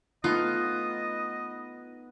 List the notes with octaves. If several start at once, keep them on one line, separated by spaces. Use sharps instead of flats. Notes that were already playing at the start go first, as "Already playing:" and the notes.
A3 B3 D#4 F4 D#5